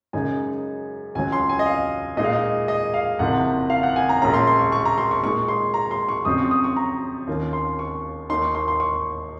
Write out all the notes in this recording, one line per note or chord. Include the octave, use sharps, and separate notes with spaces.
F#2 C#3 G#3 D#4 G#5
C#2 C#3 F#3 G#5
C6
G#5
D#5
F5
A#2 G#3 D#4 D#5
F5
D#5
D#5
F5
F#1 F2 C3 F#5
F5
F#5
G#5
A#5
A#1 A#2 G#3 C#4 F4 A#5
C6
C6
C#6
C#6
A#5
C6
C#6
A#2 G#3 D#4 C#6
C6
A#5
C6
C#6
F2 C#3 F#3 C4 D#6
C#6
D#6
C#6
A#5
D#2 D#3 A#3 C#4 F4
C6
C#6
D#2 D#3 A#3 D#4 C6
C#6
C6
C6
C#6